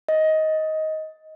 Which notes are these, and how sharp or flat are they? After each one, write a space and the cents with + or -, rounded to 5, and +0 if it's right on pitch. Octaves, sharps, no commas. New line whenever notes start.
D#5 +15